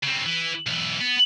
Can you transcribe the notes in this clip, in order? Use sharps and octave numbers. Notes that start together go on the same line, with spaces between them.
C#3 C4
E3
B1 E3
B3